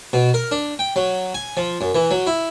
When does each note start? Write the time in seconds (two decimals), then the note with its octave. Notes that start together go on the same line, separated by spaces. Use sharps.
0.13 B2
0.34 A#4
0.51 D4
0.79 G5
0.96 F#3
1.34 G#5
1.57 F3
1.81 F#2
1.95 E3
2.11 F#3
2.27 E4